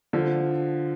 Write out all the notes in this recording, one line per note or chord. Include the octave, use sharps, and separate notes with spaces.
D3 F3